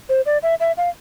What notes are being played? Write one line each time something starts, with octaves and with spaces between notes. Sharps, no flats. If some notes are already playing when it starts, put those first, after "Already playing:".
C5
D5
E5
E5
F5